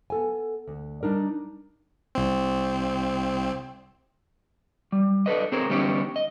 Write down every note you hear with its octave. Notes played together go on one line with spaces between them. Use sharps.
B3 A4 G#5
D2
G3 D4 D#4 A#4
C2 C4
G3
D4 A4 B4 D#5
C4 G#4 A#4 C5 C#5
D3 G3 B3 C#4 D#4 G4
D#5